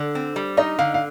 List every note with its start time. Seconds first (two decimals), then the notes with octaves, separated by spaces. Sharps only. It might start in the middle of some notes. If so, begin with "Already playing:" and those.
Already playing: D3 D5
0.15 C4
0.36 G3
0.57 D#4 D#5
0.79 D3 F5
0.94 F5